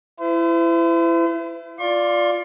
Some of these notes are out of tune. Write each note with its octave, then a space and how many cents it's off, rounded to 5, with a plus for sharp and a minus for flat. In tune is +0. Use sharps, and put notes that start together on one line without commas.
E4 +25 C5 -45
F4 +0 D5 +0 C6 +40